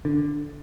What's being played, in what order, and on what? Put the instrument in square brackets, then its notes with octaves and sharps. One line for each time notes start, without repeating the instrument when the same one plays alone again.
[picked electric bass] D3